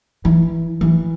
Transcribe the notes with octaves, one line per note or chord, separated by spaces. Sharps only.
E3
E3